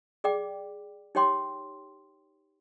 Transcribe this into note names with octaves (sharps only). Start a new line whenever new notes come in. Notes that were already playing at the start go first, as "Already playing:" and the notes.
G#4 D5 G5 D6
D#4 G4 C#5 G5 C6 D6